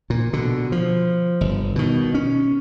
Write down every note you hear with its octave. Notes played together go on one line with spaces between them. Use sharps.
A#2
B2 D3
F3
G1
B2 D#3
C#4